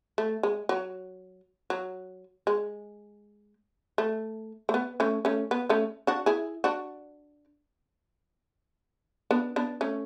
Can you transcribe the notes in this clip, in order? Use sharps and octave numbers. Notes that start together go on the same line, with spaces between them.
A3
G#3
F#3
F#3
G#3
A3
A3
B3
A3 C#4
A3 C#4
B3
A3 C#4
D4 F#4
E4 G#4
D4 F#4
B3 D4
B3 D4
A3 C#4